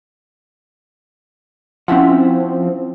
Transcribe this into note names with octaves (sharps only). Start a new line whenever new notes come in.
F3 C4 C#4 E4 F#5